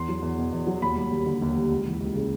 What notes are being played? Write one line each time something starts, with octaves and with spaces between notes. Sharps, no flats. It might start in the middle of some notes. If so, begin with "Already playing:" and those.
Already playing: E2 C6
F#3
E2
B2
E2
F#3
D#2 B5
G3
D#2
D3
D#2
G3
C#2
E3
C#2
C#3